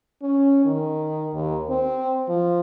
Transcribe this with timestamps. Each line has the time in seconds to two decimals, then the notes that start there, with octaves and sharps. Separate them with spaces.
0.22 C#4
0.65 D#3
1.33 D#2
1.69 C4
2.29 F3